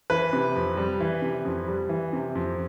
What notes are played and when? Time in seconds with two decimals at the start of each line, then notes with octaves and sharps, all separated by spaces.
0.10 E3 B4
0.33 C3
0.55 F2
0.77 G3
1.00 E3
1.22 C3
1.45 F2
1.68 G3
1.89 E3
2.13 C3
2.35 F2